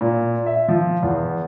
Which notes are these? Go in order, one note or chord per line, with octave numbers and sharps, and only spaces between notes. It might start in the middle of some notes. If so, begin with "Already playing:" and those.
A#2
E5
F3
E2